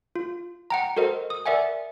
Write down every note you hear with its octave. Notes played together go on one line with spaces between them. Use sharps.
F4
F#5 G5 A#5
F#4 A4 A#4 C5 D#5 F#5
D#6
A#4 D5 E5 F#5 G#5